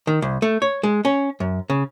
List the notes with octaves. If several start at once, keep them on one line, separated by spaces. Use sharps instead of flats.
D#3
C2
A3
C#5
G#3
C#4
F#2
C#3